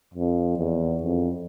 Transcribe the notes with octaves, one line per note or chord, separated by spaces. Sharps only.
F2
E2
F2